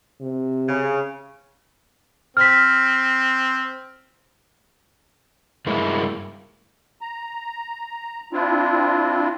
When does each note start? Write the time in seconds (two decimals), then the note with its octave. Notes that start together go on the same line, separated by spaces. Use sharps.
0.21 C3
0.69 C#3
2.37 C4 F6 B6
5.67 G2 G#3 A#3 E4
7.01 A#5
8.33 C4 D4 E4 F4